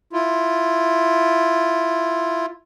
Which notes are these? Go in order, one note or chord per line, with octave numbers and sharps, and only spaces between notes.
E4 F4